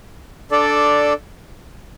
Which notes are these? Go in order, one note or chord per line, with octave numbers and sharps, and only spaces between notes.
D4 A4 D5